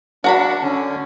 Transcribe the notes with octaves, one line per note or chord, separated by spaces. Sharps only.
D4 F#4 A#5 B5
D3 C#4